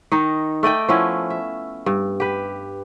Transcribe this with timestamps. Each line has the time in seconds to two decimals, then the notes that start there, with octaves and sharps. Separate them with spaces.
0.12 D#3 D#4
0.63 A3 D5 D#5 G5
0.88 F3 B3 C#4 E4
1.30 E5
1.86 G2
2.20 G4 B4